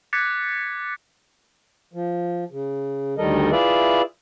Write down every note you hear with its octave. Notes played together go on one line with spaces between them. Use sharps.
D6 F#6 G#6 A6 B6 C#7
F3
C#3
D2 D#3 G3 A4 A#4 D#5
E4 F4 G#4 B4 D5 E5